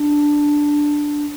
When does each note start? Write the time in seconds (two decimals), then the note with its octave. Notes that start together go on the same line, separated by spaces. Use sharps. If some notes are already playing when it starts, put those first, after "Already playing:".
Already playing: D4